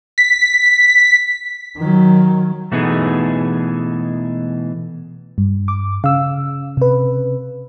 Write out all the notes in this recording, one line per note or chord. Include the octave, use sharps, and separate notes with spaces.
B6
D#3 F#3
B2 E3 A3 B3 D#4 G#4
G2
D6
C#3 F5 E6
C3 B4